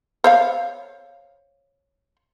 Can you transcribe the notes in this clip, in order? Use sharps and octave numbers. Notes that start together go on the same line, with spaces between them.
C5 C#5 F5